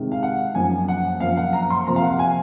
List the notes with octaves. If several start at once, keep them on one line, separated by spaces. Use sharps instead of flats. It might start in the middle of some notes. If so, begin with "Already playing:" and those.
Already playing: C3 D#3 G#3
F5
F#5
F#2 F3 A#3 G#5
F#5
F#2 F3 A#3 F5
F#5
A#5
C6
C3 F3 A#3 A#5
F5
F#5
G#5